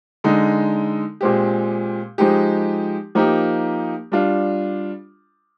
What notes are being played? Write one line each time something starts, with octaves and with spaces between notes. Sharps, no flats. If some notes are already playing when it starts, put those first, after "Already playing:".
D3 G#3 D#4
A#2 G#3 C4 G4
F3 G#3 D#4 G4
F3 A#3 D#4 G4
G3 D4 F4